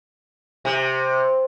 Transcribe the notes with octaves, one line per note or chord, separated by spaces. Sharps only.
C3